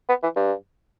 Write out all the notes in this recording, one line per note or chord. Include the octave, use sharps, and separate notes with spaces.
B3
E3
G2